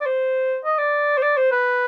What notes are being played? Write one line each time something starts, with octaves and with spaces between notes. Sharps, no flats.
D5
C5
D#5
D5
C5
D5
C5
B4